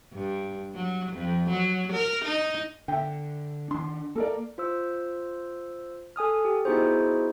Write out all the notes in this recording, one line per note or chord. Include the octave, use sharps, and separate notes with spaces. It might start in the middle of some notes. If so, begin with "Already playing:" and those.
G2
F#3
F2
F#3
A#4
D#4
D3 E5 G5
D#3 D4 C6
A#3 A4 A#4 D5
F4 C5 E6
A4 G#5 D#6 F6
G4
B3 D#4 E4 F#4 G#4 C5